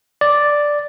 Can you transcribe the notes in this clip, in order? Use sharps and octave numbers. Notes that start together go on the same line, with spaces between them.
D5